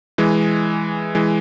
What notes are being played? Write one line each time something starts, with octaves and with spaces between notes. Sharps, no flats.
E3 G#3
E3 G#3